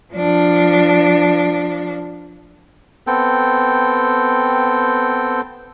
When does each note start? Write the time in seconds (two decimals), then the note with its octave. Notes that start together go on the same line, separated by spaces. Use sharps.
0.14 F3 D4
3.07 B3 C4 A4 G5